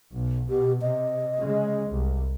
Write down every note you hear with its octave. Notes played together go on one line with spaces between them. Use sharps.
B1
B2 G4
C3 D#5
C#3 G#3
C2